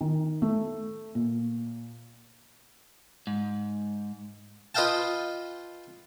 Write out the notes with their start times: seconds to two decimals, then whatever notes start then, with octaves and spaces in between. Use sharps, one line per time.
0.01 D#3
0.42 A3
1.15 A#2
3.27 G#2
4.75 F4 B4 D#5 F5 G5 A5